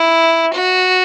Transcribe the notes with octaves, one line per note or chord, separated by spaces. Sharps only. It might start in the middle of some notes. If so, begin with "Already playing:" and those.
Already playing: E4
F#4